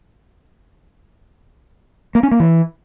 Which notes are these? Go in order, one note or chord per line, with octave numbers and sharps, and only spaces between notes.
A#3
C#4
A#3
E3